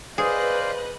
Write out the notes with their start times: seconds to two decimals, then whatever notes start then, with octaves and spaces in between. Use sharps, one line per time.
0.18 G#4 B4 C5 D5 D#5 F5 F#6